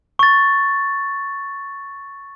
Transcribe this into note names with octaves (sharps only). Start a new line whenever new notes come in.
C#6 A6